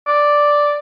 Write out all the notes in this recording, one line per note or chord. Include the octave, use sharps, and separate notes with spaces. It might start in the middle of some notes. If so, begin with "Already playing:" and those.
D5